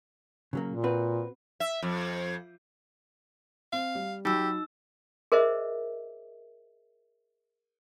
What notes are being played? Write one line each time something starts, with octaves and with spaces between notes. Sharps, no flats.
C#3 F#3 A#3
A#2
C4 F#4 B4
E5
F2
C4 F5
G3
F#3 D#4 G4 B5 E6
G#4 A#4 C5 D#5 E5